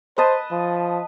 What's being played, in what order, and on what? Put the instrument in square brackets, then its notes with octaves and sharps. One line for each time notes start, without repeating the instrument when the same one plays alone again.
[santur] B4 D#5 A5 [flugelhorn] C5
[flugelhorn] F3